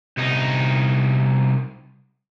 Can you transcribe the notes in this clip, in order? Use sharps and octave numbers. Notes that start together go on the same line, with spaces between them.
C2 D#4